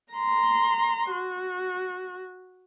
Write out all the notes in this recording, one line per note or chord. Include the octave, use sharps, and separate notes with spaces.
A#5 C6
F#4